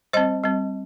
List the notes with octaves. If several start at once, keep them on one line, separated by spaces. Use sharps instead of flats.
G3 C4 C5 D#5
G3 C4